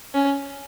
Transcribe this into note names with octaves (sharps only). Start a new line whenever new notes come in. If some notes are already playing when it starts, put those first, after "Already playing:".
C#4